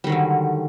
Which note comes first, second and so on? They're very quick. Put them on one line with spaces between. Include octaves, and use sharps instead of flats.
G3 D#3 F#3 D3